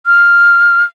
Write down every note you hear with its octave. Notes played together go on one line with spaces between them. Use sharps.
F6